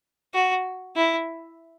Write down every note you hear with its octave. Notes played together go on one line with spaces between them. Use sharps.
F#4
E4